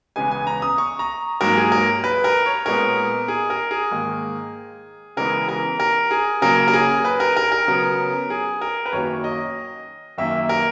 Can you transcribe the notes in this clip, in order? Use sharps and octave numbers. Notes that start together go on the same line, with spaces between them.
E2 C#3 G#3 B3 G#5
G#5
A#5
D#6
C#6
A#5
G#2 F#3 A#3 A#4
G#4
A#4
B4
A#4
C#5
A#2 G#3 B3 A#4
G#4
A#4
G#4
G#2 D#3 A#3
C#3 E3 G#3 B3 A#4
A#4
A#4
G#4
C#3 F#3 A#3 A#4
A#4
G#4
B4
A#4
A#4
A#4
C#3 F#3 B3
G#4
A#4
B4
F#2 D#3 F#3 A#3 C#5
D#5
F#2 D#3 A#3 E5
A#4